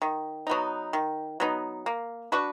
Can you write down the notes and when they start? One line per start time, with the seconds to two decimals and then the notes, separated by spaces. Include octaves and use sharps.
0.02 D#3
0.47 F#3 B3 D#4
0.93 D#3
1.40 F#3 B3 D#4
1.86 A#3
2.32 D4 F#4 B4